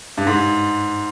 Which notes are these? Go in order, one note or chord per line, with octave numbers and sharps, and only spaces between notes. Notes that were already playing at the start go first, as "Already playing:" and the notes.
G2
G#2